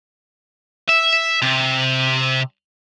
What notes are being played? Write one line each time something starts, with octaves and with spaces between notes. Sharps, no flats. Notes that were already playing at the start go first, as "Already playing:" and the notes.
E5
C3